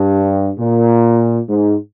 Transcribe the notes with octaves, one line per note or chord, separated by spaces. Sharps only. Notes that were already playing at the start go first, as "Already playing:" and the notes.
Already playing: G2
A#2
G#2